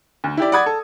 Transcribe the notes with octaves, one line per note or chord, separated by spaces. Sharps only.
D2
E4 G4 D5
D5 F#5 B5 D#6 G#6
A4